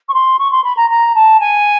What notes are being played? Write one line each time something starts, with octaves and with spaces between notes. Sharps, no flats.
C#6
C6
C#6
C6
B5
A#5
A#5
A5
G#5